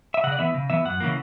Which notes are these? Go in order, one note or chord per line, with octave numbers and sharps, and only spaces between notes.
E5
C#3 F#5
D5
E3 B3 E5
C#3
E3 B3 E5
F#2 F#5
C#3 E3 A#3